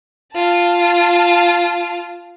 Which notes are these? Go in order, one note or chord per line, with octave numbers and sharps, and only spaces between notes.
F4 A5